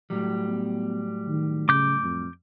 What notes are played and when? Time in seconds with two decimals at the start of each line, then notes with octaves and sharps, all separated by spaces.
0.10 A2 F#3 G3
0.47 B3
1.28 D#3
1.69 C#3 D6 G6
2.03 F2